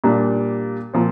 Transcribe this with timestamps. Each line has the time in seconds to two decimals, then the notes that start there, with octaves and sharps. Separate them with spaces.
0.04 A#2 G3 D4
0.93 A#2 F3 C4